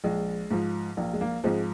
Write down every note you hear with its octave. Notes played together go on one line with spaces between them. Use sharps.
A#1 G#3
G#2 F3
A#1 A#3
G#3
A#3
G#2 F3 G#3 C4